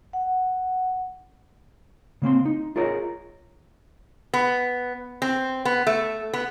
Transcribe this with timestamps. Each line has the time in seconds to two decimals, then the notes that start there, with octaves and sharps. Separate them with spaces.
0.13 F#5
2.22 C#3 A#3 C4 C6
2.45 D#4
2.76 F4 G#4 A#4 C#5 D#5
4.34 B3
5.22 C4
5.65 B3
5.87 A3
6.33 B3